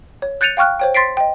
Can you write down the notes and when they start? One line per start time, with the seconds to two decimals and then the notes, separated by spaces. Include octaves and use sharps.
0.22 C#5
0.41 F#6 G6 A6 C#7 D#7 F7
0.57 F5 G5 C#6 F6 F#6
0.80 C5 C#5 G5
0.94 C6 A6 B6 C7 D7
1.17 D#5 G5